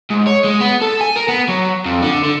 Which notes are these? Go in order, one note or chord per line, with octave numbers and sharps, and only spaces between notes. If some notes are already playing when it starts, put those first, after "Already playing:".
G#2
C#5
G#3
B3
A4
G#5
A#4
B3
F#3
F2
D3
D3